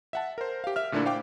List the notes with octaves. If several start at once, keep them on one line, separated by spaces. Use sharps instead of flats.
E5 F#5 A5
A#4 C5
G4 F5
E5 F6
A#2 D3 A3 A#3 D4 E4
C5 F5 G5 D6